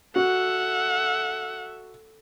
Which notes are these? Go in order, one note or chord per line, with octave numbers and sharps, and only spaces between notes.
F#4 A4 E5 F#5